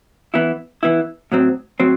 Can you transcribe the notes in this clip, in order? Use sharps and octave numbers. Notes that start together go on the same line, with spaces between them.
E3 B3 E4
E3 B3 E4
A2 F#3 C4
A2 F#3 C4